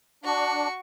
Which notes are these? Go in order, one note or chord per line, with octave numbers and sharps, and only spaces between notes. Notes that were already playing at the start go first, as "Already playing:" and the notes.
D4 F#4 C#6